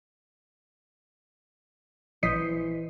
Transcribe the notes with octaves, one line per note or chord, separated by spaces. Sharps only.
A#1 E3 C5 D#5 B6 C7